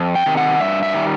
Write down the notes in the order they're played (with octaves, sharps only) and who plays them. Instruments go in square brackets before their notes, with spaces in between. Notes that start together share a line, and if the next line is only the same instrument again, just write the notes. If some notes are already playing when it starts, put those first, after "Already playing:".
Already playing: [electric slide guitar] F2
G5
C3 D#3
F#5
G2 E5
E5
D#3 G3